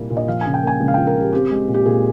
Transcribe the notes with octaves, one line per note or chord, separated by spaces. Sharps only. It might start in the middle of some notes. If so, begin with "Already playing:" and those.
Already playing: C2 A#2 G3 A#3
A#2
D#5
F3 F5
C#3 G#5
G5
A#3 G#5
C#2
F5
F3 G5
A#4
C#3 G4
C4 G4
G#3
A#2
G4
A#2 G#4